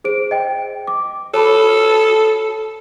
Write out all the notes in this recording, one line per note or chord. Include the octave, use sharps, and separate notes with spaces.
G#4 C5 D7
D#5 G5
D6
A4 C#5 A5 B5